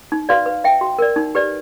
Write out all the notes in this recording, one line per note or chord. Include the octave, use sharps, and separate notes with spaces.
D#4
F#4 B4 D5 F5
B4
E5 G5
F#4
A#4 D5
D#4
G4 B4 D5